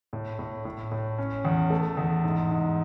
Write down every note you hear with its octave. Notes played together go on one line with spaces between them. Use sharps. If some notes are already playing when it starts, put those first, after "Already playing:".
A2
A2
A2
A2
C#4
E2
A3
E2
G#2
G#2